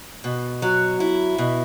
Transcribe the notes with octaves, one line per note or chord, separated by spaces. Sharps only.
B2
F#3
E4
B2